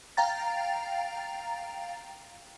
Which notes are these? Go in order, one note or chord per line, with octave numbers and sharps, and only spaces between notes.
F5 G5 A#5 A6